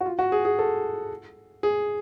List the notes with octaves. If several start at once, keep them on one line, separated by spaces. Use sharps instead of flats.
F#4
F4
F#4
G#4
G#4
A4
G#4